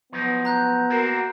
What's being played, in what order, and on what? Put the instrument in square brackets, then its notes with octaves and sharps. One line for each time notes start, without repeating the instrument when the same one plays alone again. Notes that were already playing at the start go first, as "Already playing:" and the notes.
[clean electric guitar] F3 F#3 D#4 [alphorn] B3
[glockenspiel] A#5 F#6 G6
[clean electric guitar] A#3 C4 E4 [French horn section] F#4 A#4